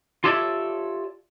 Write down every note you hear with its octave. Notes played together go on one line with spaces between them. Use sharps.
F4 G4 A4 C#5 D5 E5